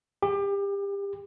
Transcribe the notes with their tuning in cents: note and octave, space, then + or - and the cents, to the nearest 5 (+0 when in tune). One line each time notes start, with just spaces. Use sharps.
G4 +30